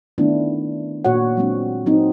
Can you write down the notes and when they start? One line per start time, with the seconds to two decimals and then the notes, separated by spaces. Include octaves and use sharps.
0.18 D#3 A3 B3 C#4 D4 E4
1.05 A#2 F#4 C#5 F#5
1.37 F#3 G#3 C4 D4
1.86 F#3 C4 D#4